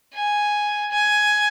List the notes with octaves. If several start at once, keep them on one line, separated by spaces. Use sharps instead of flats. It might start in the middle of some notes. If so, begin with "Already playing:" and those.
G#5
G#5